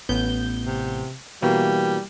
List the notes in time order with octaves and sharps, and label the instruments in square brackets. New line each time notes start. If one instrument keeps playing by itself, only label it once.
[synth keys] A1 B3 G6
[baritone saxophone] C3
[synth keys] B2 E3 A#3 [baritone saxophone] G3